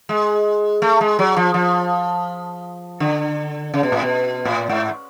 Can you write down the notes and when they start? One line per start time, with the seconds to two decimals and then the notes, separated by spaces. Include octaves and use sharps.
0.09 G#3
0.82 A3
1.01 G#3
1.19 F#3
1.37 F3
1.54 F3
3.00 D3
3.74 C#3
3.83 B2
3.92 A2
4.02 B2
4.45 A2
4.69 G#2